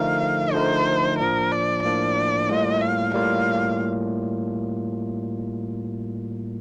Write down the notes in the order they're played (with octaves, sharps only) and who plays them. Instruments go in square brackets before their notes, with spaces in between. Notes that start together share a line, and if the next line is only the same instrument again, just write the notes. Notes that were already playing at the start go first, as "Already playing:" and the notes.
Already playing: [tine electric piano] D3 F3 A3 D#4 A#4 [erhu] F5
[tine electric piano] D3 F3 A3 D#4 A#4 [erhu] C5
[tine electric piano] A2 F3 A#3 D4 [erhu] A#4
[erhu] D5
[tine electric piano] A2 F3 A#3 D4 [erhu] D5
[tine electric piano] A2 G3 A#3 F4 [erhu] D#5
[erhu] F5
[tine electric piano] A2 G3 A#3 F4 [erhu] F5